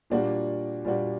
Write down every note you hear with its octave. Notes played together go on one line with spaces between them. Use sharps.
A#2 G3 A#3 D4 F#4
A#2 G3 A#3 D4 F#4